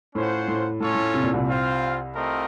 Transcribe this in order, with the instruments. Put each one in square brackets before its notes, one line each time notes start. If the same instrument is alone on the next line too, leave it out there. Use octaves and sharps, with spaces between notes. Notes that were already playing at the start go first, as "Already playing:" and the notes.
[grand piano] A2 [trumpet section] C#4 F4 C5 F#5
[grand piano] A2
[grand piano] A2 [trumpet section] A3 C#4 F4 A4 C#5
[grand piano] A2
C3
A#2
C2 C3
[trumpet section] C4 F4 C5 F5
A3 C4 F4 A#4 D#5